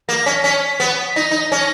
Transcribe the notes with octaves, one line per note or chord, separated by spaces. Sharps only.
A#3 A#6
C#4 B6
C#4 B6
B3
D#4 A#6
D#4
C#4 A#6